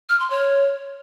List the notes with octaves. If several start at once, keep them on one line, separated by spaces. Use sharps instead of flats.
F6
C6
C#5